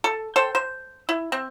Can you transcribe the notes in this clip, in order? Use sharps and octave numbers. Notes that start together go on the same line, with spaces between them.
A4
A4 C5 G5
C5
E4
C4